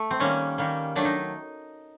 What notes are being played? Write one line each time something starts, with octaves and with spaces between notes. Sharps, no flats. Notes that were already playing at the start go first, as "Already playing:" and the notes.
Already playing: A3
C4
D#3 G3 A#3 C#4
D#3 G3 A#3
D#3 F#3 A3 D4
D#4